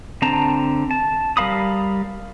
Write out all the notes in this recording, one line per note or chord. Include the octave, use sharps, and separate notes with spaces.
D3 C4 A5 A#5
A5
G3 A#4 F5 B5 D#6